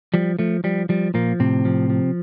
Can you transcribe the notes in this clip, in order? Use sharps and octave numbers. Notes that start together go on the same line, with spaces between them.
F3 G3
F3 A3
F3 G3
F3 G3
A#2 F3 A#3
A2 C3 C4
F3
F3